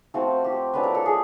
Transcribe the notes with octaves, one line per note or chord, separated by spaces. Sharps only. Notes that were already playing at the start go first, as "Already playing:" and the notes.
F3 A3 C4 F4 F#4
G4
F#3 A3 D4 F4 B4
A#4
A4
G#4